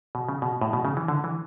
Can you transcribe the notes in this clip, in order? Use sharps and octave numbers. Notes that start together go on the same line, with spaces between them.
B2
C#3
B2
A2
B2
C#3
E3
D3
E3